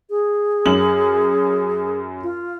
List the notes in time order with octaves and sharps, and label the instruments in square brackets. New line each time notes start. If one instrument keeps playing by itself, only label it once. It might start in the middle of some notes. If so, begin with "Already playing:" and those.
[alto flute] G#4
[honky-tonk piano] F#2 C#4 F#7
[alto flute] F4